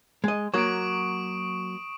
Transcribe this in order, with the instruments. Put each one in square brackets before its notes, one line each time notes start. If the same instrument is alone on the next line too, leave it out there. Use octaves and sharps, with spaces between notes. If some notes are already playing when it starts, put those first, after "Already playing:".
[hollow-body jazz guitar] G#3 D#5
[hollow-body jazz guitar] F#3 A#3 F#4 [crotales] C#6 D#6 D7